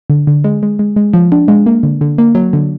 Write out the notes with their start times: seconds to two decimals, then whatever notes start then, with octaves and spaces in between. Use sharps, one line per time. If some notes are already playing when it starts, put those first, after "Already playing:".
0.10 D3
0.27 D3
0.44 G#3
0.63 G#3
0.79 G#3
0.96 G#3
1.14 F3
1.32 D4
1.48 G#3
1.66 A#3
1.83 D3
2.01 D3
2.18 A#3
2.35 F#3
2.53 D3